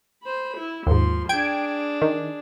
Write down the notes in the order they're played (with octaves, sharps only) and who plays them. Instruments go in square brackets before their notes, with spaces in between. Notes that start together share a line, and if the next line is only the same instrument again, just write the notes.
[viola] C5 B5
E4
[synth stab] D#2 G#2 [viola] F3 C6
[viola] D4 G#4 [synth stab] G5 G#6 D7
[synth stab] D#3